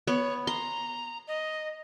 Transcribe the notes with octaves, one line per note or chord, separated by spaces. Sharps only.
B3 C#5
A#5 C6
D#5